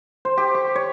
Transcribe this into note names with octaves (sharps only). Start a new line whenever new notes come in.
C5
G4
C#6
C#5